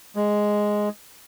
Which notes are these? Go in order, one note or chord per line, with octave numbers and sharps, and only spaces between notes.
G#3